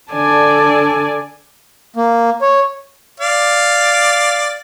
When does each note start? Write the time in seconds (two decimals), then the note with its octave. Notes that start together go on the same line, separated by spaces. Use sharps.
0.11 D3 D4 A4 D5 G#5 A5
1.96 A#3
2.42 C#5
3.20 D5 F5